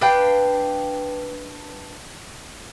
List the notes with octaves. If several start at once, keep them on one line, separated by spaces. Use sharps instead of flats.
D4 B4 F5 G5